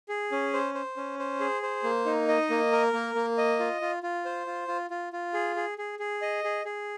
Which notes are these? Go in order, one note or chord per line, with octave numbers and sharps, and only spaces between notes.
G#4
C#4
C5
C5
C#4
C5
G#4
C5
A#3
D#4
D#5
A#3
A#4
A#3
A#3
D#5
F4
F4
F4
C5
F4
F4
F4
F4
G#4
G#4
G#4
G#4
D#5
G#4
G#4